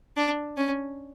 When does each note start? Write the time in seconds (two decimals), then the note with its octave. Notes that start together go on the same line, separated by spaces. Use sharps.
0.17 D4
0.57 C#4